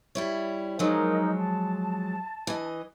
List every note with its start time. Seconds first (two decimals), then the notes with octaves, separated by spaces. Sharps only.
0.15 G3 E4 C#5
0.79 F3 F#3 G#3 D#4 A#4
1.37 A5
2.47 E3 D#5